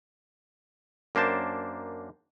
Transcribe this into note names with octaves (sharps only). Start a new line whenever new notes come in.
F#2 A#3 D4 C5 A5